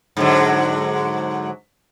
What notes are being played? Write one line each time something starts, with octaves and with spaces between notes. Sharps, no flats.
G#2 D3 F#3